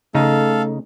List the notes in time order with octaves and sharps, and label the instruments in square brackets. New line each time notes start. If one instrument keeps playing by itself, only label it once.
[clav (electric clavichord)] C#3 D#4 [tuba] A3 [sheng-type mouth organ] A4 F5